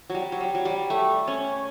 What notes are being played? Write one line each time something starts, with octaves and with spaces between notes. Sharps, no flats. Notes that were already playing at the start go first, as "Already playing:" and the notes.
F#3
G3
F#3
G3
F#3
G3
A3
C#4